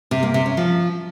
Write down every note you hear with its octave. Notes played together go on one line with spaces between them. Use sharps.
C3
A#3
C3
C#4
F3